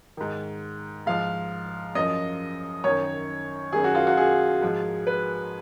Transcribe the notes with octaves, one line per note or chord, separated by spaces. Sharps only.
G#2 D#3
G#2 F3 F5
F#2 F3 D#5
F#2 D#3 C#5
F#2 D#3 G#4
F#4
F4
F#4
G#4
G#2 F3
B4